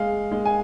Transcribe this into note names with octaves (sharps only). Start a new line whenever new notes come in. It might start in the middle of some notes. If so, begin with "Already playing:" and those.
Already playing: G#3 F5
G#3
G#5